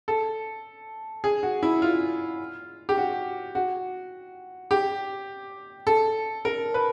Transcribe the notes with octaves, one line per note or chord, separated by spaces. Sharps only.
A4
G#4
F#4
E4
F4
G4
F#4
F#4
G4
A4
A#4
B4